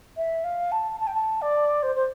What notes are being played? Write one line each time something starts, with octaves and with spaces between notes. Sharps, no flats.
E5
F5
A5
A5
G5
A5
D5
C5
C5